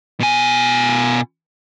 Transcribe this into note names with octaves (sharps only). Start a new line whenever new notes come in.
B2 G#5